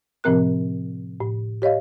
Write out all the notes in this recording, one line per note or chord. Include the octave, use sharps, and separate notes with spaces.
A2 C3 F3 C4 A#4 F#6
A2
G4 C#5 D#5 F5